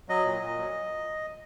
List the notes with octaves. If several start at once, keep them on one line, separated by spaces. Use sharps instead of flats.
F#3 D#5
A#2
A#2
F#3